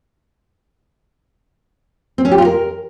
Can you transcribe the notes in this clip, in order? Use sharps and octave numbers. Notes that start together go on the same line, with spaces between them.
C4
C#4
G4
F4
A#4